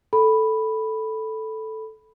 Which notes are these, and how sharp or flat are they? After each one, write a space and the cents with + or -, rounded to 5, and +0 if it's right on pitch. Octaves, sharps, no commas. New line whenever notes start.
A4 +0 B5 +0